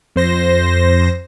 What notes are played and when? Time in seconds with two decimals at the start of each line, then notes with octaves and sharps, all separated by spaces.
0.16 F2 C5 A#6